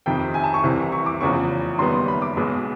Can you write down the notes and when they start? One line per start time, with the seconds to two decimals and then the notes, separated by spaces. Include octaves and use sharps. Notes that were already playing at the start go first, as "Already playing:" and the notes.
0.06 F2 C3 D#3 G5
0.34 G#5
0.44 A5
0.54 C#6
0.64 C2 C3 E3
0.92 C#6
1.06 D6
1.21 F1 E2 C#3 F3 C#6
1.78 F#1 F#2 D#3 G3 B3 C6
2.08 B5
2.22 D6
2.36 B1 B2 G#3 B3